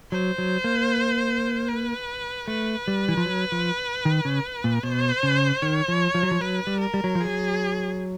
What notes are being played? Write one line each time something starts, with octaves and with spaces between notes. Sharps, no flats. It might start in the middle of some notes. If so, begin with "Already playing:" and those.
F#3 C5
F#3
A#3
B4
A3 B4
G3
E3
F3
F#3
F3
D#3
C#3
A#2
B2 C5
C#3
D#3 C#5
F3
F3
F#3
F3
F#3 B4
G3
A#4
G3
F#3
F3
F#3 G#4